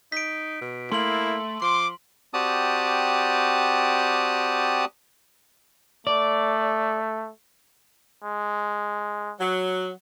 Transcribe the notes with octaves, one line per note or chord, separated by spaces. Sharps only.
D#4 B6 D7
B2
A3 A#3 E4 C6 F#7
F3 C6 D6
C4 F#4 G4 D5 A5 D#6
A3 D5
G#3
F#3